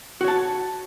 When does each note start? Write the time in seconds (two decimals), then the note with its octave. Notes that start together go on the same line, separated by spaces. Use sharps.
0.21 F#4
0.24 C#5
0.28 A5